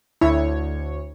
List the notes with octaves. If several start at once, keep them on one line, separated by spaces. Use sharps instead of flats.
D2 E4 C#5